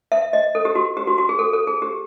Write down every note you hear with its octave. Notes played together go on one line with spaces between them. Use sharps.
E5
D#5
A4
G4
F#4
G4
F#4
F#4
G#4
A4
A4
G#4
G4